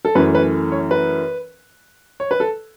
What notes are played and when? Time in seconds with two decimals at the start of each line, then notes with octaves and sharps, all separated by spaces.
0.05 A4
0.15 F#2 E3 A3 C#4 B4
0.35 B4
0.72 C#5
0.91 B4
2.20 C#5
2.31 B4
2.40 A4